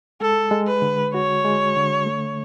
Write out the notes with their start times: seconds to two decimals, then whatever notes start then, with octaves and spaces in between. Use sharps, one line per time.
0.21 G#3 A4
0.51 G#3
0.67 B4
0.82 D3
1.14 F#4 C#5
1.45 G#3
1.76 D3
2.06 A3